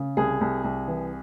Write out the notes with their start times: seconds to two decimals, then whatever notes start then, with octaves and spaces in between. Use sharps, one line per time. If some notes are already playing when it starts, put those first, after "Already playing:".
Already playing: C#3
0.17 C2 G#4
0.41 C2
0.64 C2
0.88 E3